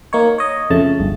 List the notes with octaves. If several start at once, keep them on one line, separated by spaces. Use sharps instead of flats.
A#3 D#4 C#5
C#5 D#5
F2 C#3 A3 A5
G1